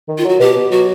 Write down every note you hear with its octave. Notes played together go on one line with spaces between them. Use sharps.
D#3
F4
F#3 F#4
B2 G4
B2
F#3 F#4